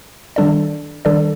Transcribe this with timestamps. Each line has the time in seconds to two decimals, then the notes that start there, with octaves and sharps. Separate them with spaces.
0.36 D#3 G3 D4 A4 D5
1.05 D#3 G3 D4 A4 D5